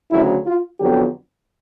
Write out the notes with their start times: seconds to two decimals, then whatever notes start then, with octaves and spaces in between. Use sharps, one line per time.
0.11 D2 C#3 F#3 E4
0.46 F4
0.80 F2 D3 F#3 B3 G4